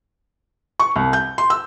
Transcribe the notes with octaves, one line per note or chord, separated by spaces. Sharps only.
C#6
C2
G6
C6
E6